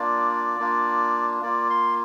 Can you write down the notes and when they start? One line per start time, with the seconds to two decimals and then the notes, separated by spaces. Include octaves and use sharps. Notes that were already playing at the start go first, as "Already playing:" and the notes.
Already playing: A#3 D4 F4 D5
0.60 A#3 D4 F4
1.43 A#3 F4 D5
1.70 C6